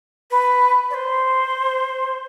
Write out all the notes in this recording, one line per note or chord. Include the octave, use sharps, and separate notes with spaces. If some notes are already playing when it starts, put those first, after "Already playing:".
B4
D5
C5